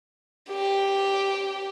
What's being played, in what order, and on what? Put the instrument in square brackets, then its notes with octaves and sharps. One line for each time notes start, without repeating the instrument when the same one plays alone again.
[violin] G4